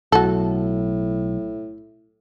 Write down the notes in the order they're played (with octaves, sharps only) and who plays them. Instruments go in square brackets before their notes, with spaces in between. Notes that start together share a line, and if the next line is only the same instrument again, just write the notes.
[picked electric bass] B1 [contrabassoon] A2 [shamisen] F#4 A4